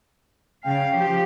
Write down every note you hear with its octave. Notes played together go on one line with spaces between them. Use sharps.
C#3 F5 G5
F3 G4